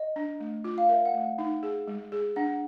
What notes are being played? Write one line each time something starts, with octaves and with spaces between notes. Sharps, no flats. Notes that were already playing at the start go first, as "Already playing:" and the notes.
Already playing: D#5
D4
A3
F4
F5
A#4 E5
F#5
A3
D#4
G#4
G#3
G#4
D4 F#5